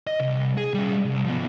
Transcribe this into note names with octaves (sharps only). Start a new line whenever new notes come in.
D#5
C2
G#4
G3 C#4
C2
F3 B3